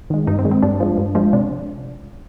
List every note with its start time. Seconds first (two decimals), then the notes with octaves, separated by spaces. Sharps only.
0.10 D#3 G#3
0.27 G2 D#4
0.39 C4
0.45 D#3 G#3
0.51 C4
0.62 G2 D4
0.80 F3 G#3
0.98 G2
1.15 F3 G#3
1.33 C3 D4